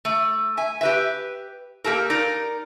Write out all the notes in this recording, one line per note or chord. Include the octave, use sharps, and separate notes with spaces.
A3
E5 G#5
G4 B4 E5
A#3 G4 A4 A#4
D#4 A#4 D5